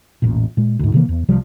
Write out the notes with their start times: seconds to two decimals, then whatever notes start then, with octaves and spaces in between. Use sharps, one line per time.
0.22 E1 A1 A#2
0.57 A#2 G#3
0.79 D2 G#2
0.94 C3 D#3 E3 A#3
1.09 E2
1.28 C2 C3 F3 G3